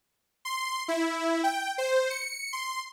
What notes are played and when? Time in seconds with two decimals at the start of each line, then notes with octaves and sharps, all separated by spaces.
0.45 C6
0.88 E4
1.44 G5
1.78 C5
2.10 C#7
2.53 C6